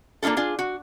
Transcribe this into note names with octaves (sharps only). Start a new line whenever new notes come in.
A#3 D4 D#4 F4 A4
D4 F4 G#4
F#4